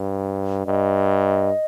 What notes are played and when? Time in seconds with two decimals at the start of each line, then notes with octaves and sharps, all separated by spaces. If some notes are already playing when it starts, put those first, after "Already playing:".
Already playing: G2
0.66 G2 D#5